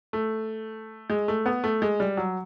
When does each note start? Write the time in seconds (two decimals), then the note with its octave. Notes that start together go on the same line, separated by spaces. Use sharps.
0.13 A3
1.10 G#3
1.28 A3
1.46 B3
1.64 A3
1.82 G#3
2.00 G3
2.17 F#3